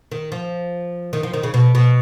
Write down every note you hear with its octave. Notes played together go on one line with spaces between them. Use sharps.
D#3
F3
D#3
F3
D#3
C#3
B2
B2